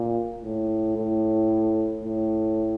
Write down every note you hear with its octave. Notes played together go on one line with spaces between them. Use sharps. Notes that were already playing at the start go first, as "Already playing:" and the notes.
Already playing: A#2
A2
A2
A2